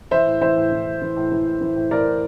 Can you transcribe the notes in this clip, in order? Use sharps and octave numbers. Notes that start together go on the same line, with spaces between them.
E3 C5 E5
A2
E3 C5 E5
A2
E3
A2
E3
A2
E3
A2
E3
A2
E3 A#4 D5
A2